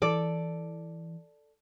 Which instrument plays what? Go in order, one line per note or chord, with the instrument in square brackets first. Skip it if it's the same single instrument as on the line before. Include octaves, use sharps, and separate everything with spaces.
[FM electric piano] E3 [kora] A4 D5